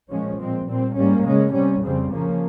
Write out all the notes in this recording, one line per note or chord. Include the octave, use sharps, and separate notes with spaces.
A#2 F3 G#3 C#4
A#2 G#3 C4
A#2 G3 C4
G#2 G3 A#3 C#4
C#3 G#3 C#4
C3 G3 C#4
F2 C#3 G3 C4
C#3 F3 A#3 C#4